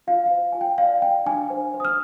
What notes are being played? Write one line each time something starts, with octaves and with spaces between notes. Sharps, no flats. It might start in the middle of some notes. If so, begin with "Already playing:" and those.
F4 F5
C5 F5
F4 G#5
G5
D5 F5
D5 G5
D4 G#5
C5
C5
D#6
F6